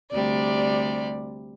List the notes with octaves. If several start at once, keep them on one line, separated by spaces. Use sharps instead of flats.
D2 C3 G3 D5